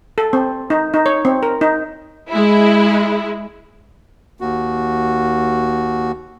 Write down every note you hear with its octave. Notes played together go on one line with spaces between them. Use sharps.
A4
C4
D#4
D#4
C#5
C4
A#4
D#4
G#3 E4
D#2 F#4